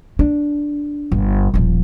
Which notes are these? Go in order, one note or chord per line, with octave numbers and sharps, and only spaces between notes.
D4
G1
D#1 F3